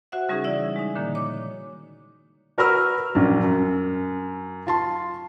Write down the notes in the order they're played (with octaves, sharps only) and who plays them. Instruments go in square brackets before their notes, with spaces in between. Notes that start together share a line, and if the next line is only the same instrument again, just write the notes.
[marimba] F#4 C5 E5 F#5
C#3 G3 C#4 D#4 G#4
E3 E4 D5 E5
G#3 D#4
A#2 D3 D#3 F3 A#3
C#5 D6
[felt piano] F#4 A#4 B4 B5 E6 F6
A#1 F#2
F#2
F4 A5 C6